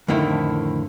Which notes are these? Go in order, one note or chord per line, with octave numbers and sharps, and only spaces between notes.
F2 A2 D3 D#3 E4